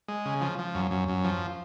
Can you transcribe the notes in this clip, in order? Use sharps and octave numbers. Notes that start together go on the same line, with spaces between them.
G#3
C#3
F3
F3
F#2
F#2
F#2
F3